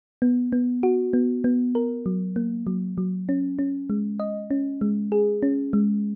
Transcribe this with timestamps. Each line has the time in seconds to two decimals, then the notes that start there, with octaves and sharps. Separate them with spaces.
0.22 B3
0.52 B3
0.83 F#4
1.13 B3
1.44 B3
1.75 A#4
2.06 F#3
2.36 A#3
2.67 F#3
2.98 F#3
3.29 C#4
3.59 C#4
3.90 G#3
4.20 D#5
4.51 C#4
4.81 G#3
5.12 G#4
5.43 C#4
5.73 G#3